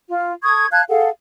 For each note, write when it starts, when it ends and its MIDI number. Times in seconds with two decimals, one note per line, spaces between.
0.08 0.31 65
0.43 0.66 69
0.43 0.66 85
0.43 0.66 87
0.43 0.66 92
0.71 0.82 77
0.71 0.82 81
0.71 0.82 90
0.71 0.82 92
0.89 1.08 68
0.89 1.08 69
0.89 1.08 77
0.89 1.08 78